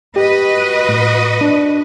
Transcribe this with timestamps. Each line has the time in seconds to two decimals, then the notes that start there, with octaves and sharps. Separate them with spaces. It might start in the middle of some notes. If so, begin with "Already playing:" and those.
0.16 F#4 G4 B4 D#5
0.89 A2
1.41 D4